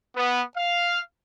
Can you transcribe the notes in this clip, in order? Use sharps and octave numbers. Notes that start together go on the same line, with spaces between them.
B3
F5